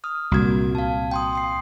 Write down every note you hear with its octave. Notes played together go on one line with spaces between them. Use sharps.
D#6 F6
C2 A#2 A#3 F#4 G#6
F5 A5
G5 C6 D#6
C6 D#6 C7